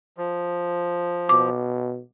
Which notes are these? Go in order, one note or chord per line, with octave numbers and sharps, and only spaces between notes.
F3
B2 D6